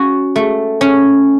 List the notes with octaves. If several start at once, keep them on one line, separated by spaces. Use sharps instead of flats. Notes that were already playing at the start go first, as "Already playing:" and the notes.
Already playing: C#4 F#4
A3
C#4